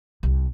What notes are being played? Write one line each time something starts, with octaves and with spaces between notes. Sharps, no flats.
C2